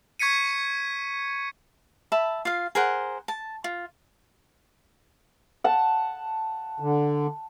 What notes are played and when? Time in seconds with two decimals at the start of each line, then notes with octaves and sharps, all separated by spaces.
0.19 C#6 G#6 B6 C#7 D#7
2.12 E5 A5 B5
2.45 F4 F5
2.75 G#4 A#4 C5 F#5
3.28 A5
3.64 F4
5.64 F#5 A5
6.80 D3